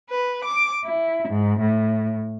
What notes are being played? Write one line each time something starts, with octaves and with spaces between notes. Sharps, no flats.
B4
D6
E4
G#2
A2